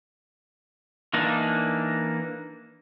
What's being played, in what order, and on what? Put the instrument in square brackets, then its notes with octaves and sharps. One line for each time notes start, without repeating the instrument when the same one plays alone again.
[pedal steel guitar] E3 A#3 D4 D#4